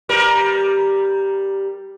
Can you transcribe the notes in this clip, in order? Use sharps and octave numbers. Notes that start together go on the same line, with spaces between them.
G3 A#4